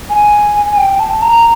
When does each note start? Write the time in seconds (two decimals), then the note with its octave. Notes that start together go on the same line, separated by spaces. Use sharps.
0.10 G#5
0.78 G5
0.99 A5
1.22 A#5